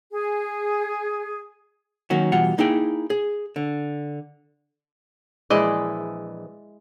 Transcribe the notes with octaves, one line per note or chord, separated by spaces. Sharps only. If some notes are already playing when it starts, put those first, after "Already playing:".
G#4
D#3 F#3 A#3 C#4 F#4
B2 E3 G3 F4 F#5
A#3 D#4 E4 G#4 G5
G#4
D3
A#1 E3 G#3 E4 D5 D#5